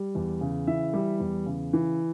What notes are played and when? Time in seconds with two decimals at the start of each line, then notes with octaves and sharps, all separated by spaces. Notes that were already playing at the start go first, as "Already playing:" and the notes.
Already playing: G3
0.15 E2
0.41 C#3
0.67 E3 E5
0.93 G3
1.20 E2
1.46 C#3
1.73 E3